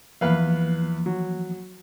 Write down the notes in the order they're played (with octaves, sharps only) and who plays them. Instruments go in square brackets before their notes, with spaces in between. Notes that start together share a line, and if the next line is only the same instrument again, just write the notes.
[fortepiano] E2 B4 F5 [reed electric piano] E3 F3 A#3
[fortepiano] F#3